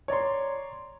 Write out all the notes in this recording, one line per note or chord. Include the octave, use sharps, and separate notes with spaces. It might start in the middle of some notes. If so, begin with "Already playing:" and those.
C#5 D5 A#5 C6